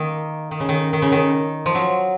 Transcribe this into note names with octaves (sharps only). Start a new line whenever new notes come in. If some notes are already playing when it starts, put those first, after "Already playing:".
Already playing: D#3 A#3
D#3
C#3
D#3
D#3
C#3
D#3
F3
F#3